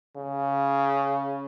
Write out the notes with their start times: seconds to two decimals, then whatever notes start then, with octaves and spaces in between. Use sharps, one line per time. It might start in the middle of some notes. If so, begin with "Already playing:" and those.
0.16 C#3